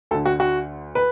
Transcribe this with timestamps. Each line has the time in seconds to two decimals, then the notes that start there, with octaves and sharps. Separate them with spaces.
0.11 D2 A4
0.15 D3
0.26 F#4
0.40 F#4
0.95 B4